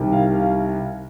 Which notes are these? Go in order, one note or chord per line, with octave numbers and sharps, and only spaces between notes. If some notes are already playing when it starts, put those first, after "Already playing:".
Already playing: C2 C3 D#3 G3
F5
F5